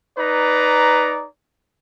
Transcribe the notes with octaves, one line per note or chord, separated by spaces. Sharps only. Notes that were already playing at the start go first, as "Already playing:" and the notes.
D#4 B4 D5 A#5